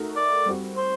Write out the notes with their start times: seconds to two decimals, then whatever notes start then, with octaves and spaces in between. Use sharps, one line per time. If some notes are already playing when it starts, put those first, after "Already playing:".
Already playing: A3 D#4 F#4 A#4
0.17 D5
0.46 G3 C4 F#4
0.77 C5